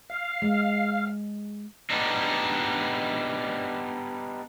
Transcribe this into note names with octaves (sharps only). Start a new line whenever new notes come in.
F5
G#3
G3 B3 D4 D#4